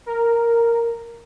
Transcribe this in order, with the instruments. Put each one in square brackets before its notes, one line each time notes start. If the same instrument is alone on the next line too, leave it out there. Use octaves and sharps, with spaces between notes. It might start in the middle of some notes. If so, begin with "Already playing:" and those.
[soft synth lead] A#4